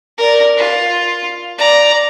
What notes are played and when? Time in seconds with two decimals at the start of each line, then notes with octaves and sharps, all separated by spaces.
0.18 A#4 D5
0.57 F4
1.58 D5 A#5